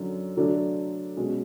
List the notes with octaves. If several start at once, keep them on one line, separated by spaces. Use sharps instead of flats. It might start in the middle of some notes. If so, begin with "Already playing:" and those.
Already playing: F#2 D3 F#3
D3 F#3 A3 D4 A4
B2 G#3 C#4